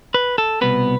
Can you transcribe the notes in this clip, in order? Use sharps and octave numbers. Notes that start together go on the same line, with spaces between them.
B4
A4
C2 B2 B3 B4